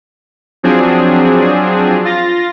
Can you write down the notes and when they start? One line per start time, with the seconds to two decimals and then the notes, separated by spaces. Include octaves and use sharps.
0.63 F3 F#3 C4 D4 G#4
2.05 F4 A6 A#6